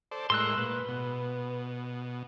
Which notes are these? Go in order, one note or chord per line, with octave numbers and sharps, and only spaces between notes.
A4 C5 D5
A2 G#3 A#4 C6 E6 F#6
A#2 B4
B2